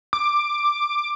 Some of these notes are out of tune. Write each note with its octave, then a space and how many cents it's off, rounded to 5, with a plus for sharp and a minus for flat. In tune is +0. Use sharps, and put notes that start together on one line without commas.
D6 +10